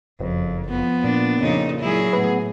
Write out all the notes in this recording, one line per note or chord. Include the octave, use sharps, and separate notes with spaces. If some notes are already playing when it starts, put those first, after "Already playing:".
F#1 F2
F3 B3
A#2 D4
F2 C#3 D#4
F#3 E4 G#4
A2 B3